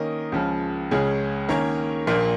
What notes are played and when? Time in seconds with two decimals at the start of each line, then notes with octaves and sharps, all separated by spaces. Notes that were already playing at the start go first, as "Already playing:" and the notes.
Already playing: D#3 A#3 C#4 A#4 D#5
0.32 C#2 C#3 F3
0.91 C#2 C#3 G#3 C#4 G#4
1.49 D#3 A#3 C#4 A#4 C#5
2.07 A#1 A#2 A#3